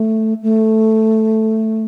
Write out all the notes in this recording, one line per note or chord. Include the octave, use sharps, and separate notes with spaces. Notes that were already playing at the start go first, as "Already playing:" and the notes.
Already playing: A3
A3